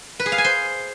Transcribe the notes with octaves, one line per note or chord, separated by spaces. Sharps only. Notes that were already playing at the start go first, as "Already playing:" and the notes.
B4
G#4
F5
G#5
C5